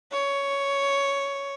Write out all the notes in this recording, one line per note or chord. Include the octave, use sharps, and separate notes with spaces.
C#5